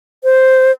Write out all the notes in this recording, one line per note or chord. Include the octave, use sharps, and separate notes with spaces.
C5